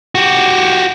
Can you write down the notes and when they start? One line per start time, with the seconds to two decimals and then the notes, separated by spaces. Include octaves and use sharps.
0.15 F#4 G4